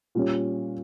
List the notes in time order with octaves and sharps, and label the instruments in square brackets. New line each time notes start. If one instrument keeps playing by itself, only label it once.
[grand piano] A#2 G3 C#4